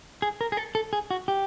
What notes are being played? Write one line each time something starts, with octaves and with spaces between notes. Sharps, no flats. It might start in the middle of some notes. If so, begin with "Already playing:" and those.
G#4
A#4
G#4
A4
A4
G#4
F#4
G4